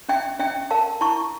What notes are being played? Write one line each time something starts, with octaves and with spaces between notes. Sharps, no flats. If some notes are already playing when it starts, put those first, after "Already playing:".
C#4 E5 G5
C#4 E5 G5
A#4 F5 A5
E4 A5 C#6